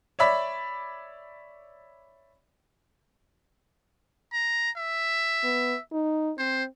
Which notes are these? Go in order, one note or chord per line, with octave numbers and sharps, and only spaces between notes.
C#5 D5 E5 B5
A#5
E5
B3
D#4
C4 C5